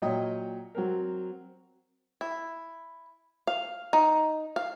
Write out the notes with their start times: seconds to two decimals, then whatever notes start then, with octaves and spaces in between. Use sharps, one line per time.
0.02 A#2 F#3 C#5 D#5 G5 D#6
0.75 F#3 C4 A#4
2.21 E4
3.47 F5
3.93 D#4
4.56 F5